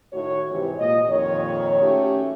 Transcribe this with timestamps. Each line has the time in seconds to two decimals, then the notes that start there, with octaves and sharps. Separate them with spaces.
0.13 A2 D#3 F#4 C#5
0.50 G#2 C3 E3 G4
0.78 A#2 D#5
1.09 F2 A#2 D#3 C#5
1.81 A3 C#4 F#4 G4